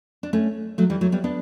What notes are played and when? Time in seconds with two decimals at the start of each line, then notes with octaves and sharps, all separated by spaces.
0.23 D4
0.33 A3 C#4
0.78 F#3 A3
0.90 E3 G3
1.01 F#3 A3
1.12 G3 B3
1.24 B3 D4